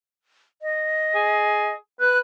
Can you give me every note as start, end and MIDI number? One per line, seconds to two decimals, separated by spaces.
0.62 1.74 75
1.15 1.73 68
2.00 2.18 71
2.00 2.19 90